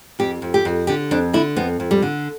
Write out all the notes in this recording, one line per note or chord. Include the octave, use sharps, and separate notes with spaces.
F2 G4
F2
G4
F2
D3 G4
F2 D4
D3 E4
F2 B3
F2
G3
D3